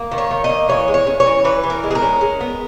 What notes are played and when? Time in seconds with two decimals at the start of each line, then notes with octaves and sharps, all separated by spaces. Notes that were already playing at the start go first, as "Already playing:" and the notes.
Already playing: A#3
0.12 D#3
0.18 C#5
0.31 D#3
0.44 D#5
0.49 A#3
0.69 E3 C#5
0.88 G#3
0.94 C#5
1.07 C#4
1.20 C#5
1.26 E3
1.44 E3 B4
1.64 E3
1.70 A#4
1.84 G#3
1.91 G#4
1.95 A#4
2.02 C#4
2.21 G#3
2.40 B3